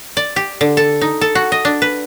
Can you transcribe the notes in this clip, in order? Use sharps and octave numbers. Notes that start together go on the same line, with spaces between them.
D5
G4
D3
A4
D#4
A4
F#4
D#5
D4
B4